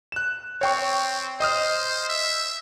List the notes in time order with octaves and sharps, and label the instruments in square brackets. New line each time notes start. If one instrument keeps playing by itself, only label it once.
[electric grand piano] F#6 E7
[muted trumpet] C4 [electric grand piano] C#5 G5 C#6
[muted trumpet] C5 [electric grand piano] D#5 D#6 F6
[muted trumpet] E5